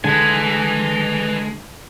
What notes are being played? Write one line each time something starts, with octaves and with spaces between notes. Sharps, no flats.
D3 G#3 B4 G#5